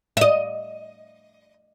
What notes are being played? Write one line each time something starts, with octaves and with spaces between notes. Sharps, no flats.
D#5 E5